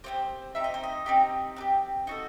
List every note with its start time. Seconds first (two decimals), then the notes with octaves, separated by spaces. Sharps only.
0.04 C4 D#4 G4 C5
0.55 C4 D#4 G4 E5
0.64 D#5
0.74 C5
0.83 D#5
1.06 C4 D#4 G4
1.56 C4 D#4 G4
2.07 D#4 F#4 A4